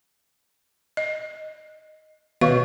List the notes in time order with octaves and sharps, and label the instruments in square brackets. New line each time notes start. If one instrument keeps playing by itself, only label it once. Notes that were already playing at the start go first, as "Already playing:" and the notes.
[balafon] D#5
[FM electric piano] B2 [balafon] D#3 F5 C#6